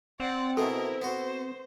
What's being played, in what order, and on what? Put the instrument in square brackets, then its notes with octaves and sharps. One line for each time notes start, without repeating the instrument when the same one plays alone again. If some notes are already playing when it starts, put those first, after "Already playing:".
[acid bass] C4 [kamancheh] D5 F#5
[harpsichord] B2 G#3 A3 [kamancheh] E4 A#4 [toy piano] A4
[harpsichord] B3 F#4 [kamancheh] C5